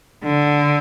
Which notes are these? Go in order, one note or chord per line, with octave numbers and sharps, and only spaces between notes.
D3